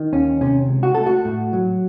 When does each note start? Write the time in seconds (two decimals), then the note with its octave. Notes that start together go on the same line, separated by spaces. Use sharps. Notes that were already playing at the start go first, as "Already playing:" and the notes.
Already playing: D#3
0.13 D#2 C#4
0.41 C3 C#4
0.69 C#2
0.83 F#4
0.95 A3 A4
1.06 F#4
1.25 A2
1.53 F#3